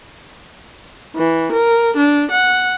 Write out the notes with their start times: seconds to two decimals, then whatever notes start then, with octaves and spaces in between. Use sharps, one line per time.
1.16 E3
1.53 A#4
1.97 D4
2.31 F#5